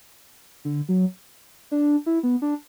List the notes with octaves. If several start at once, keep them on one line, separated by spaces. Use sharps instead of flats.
D3
F#3
D4
E4
B3
D4